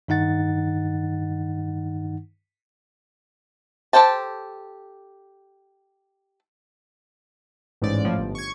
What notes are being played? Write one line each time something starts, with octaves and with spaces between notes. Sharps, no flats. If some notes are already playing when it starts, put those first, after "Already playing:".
G2 D#3 D#4 F#5 A6
G4 A4 C5 G5 A5
A1 G#2 D5
A2 F3
G1
C#6 G#6